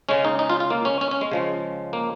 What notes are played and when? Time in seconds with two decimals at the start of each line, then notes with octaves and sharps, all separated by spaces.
0.09 C#3 G#3 C#4
0.25 D#4
0.39 D#4
0.49 F4
0.60 F4
0.70 A#3
0.85 C#4
1.01 C#4
1.11 C#4
1.21 G#3
1.32 C#3 F3 G#3
1.93 A#3